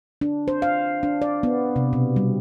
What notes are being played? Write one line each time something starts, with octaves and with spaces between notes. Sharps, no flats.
D4
C5
F5
D4
D5
B3
C3
B2
G3